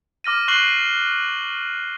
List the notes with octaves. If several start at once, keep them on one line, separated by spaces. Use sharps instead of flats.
D6 F6 A#6 D#7
C#6 F#6 C7 F#7 G7